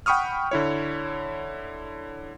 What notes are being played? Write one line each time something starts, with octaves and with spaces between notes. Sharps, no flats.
F#5 G5 B5 C#6 D#6 F6
D3 E4 C#5